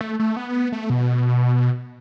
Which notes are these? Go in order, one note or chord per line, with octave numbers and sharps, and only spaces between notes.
A3
A3
B3
A3
B2